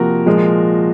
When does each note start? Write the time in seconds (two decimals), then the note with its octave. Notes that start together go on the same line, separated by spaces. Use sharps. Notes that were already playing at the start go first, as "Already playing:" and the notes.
Already playing: C3 F3 A#3 F#4 A#4
0.26 A#2 F3 G#3